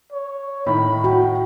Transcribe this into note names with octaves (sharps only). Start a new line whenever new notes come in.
C#5
A2 D#3 B5
F#4 G5